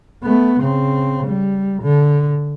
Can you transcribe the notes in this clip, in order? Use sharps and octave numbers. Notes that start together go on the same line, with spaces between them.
A3 B3
C#3 C4
G3
D3